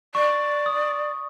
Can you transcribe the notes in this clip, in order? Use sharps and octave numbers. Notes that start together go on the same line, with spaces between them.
D5 C#6
D#6